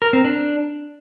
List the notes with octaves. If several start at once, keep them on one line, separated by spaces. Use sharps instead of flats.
A#4
C4
D4